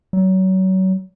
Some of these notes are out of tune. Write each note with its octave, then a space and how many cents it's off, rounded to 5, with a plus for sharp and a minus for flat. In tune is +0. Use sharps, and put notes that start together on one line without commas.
F#3 +30